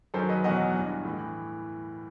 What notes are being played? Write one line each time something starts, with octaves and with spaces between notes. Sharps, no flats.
F#2 D#3 F#3 A4 C5
B4 D#5
E2 B2 F#3 D#5 F#5
G2 E3
A2 E3